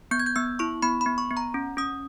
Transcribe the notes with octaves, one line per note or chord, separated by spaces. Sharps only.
B3 G6
G#6
G6
B3 E6
E4 C#6
B3 B5
B5
B3
C#6
B3
A#5
C#4
C#4 D#6